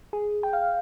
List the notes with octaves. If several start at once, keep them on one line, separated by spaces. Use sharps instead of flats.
G#4
G5
F5